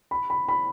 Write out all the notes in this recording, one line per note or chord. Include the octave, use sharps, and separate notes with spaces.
B5
B5
B5